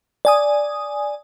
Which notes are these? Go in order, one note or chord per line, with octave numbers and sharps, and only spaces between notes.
D5 G#5 D#6